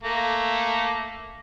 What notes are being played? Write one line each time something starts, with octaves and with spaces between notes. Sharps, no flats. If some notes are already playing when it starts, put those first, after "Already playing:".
A3 A#3